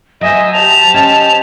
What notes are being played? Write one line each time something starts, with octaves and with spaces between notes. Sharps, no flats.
F#3 C5 D#5 E5 G#5
G4 A5 F7
C#4 C5 D#5